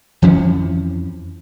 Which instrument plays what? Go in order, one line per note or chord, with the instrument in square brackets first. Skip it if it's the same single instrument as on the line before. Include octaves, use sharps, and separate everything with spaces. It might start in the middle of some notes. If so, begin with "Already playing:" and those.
[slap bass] F2 E3 F3 C#4